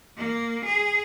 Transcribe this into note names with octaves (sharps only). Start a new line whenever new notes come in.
A#3
G#4